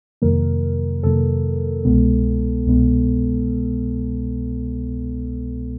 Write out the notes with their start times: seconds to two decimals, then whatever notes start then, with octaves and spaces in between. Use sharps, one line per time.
0.22 F2 C3 D#3 F#3 A#3 A#4
1.03 F2 C3 D#3 F#3 A#3 A4
1.85 C2 B2 G#3 B3
2.67 C2 B2 G#3 B3